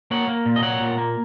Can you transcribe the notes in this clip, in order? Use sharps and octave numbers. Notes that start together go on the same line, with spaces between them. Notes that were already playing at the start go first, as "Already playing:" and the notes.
A#3 C#5 F#5
A#3
A#2
D#5
A#3 C#5 F#5
A#2
A#3